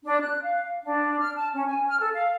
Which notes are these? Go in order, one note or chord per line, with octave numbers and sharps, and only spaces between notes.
D4
F#6
F5
D4
F6
A5
C#4
G#5
F6
A4
F5